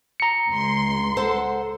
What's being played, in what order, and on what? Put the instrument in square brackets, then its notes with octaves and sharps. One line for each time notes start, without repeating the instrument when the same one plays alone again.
[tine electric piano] A#5 C#7
[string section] C#2 C6
[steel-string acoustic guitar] A4 C5 F#5